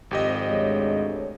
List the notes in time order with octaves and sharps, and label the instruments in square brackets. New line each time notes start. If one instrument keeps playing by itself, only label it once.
[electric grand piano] G#1 G4 D#5 [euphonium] F2
[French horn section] D2 C#5 [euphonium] G#3